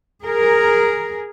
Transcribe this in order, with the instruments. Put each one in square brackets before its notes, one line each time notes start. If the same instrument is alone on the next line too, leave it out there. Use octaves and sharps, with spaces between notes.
[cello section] G#4 A#4